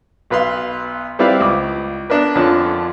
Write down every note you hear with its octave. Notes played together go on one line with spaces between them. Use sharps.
B1 B3 B4 F5 C6
G3 C4 E4 B4 D5 F5
C#2 D6
B3 D4 A#4 B4
F2 D3 C#4 F4 A5 F#6